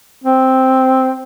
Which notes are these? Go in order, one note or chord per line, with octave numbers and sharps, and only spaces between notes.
C4